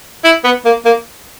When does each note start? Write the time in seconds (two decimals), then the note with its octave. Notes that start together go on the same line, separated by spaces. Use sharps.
0.24 E4
0.44 B3
0.65 A#3
0.85 A#3